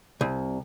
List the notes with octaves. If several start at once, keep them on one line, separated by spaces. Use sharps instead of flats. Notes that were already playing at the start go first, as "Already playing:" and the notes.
C2